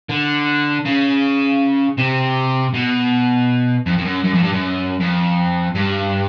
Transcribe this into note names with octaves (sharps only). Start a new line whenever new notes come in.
D3
C#3
C3
B2
F2
F2
F#2
F#2
F2
G2
F#2
F2
G2